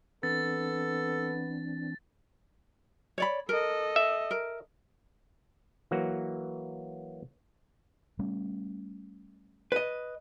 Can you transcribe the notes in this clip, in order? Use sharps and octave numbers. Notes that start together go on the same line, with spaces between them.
E3 B3 C4 D4 A4 A6
C#5 D5 B5
A4 A#4 D#5
E5
A#4
E3 F#3 A#3 F#4
G3 A3 C#4
B4 D#5